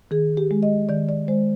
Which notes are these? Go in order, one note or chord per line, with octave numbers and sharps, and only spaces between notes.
D#3 G#4
G4
G#3
D#5
D#3 D5
D5
G#3 C5